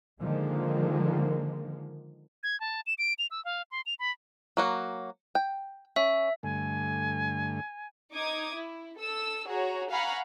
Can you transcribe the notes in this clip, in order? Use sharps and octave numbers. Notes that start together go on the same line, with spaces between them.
D3 D#3 F3 G#3 A#3
G#6
A5
E7
D7
F7
E6
F5
C6
F7
B5
F#3 A#3 F#4
G5
C#4 E5
G2 D3 A3 G#5
D#4 D6 D#6 G#6
E4
A4 E6
F#4 G#4 C#5 A#5
F5 F#5 G#5 A#5 B5 C#6